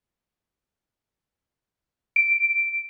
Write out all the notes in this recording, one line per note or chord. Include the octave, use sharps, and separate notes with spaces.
D7